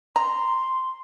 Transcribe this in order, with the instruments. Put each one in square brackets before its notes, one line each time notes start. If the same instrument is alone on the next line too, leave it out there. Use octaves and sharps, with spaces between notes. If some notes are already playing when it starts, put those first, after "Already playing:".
[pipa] A#5 [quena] C6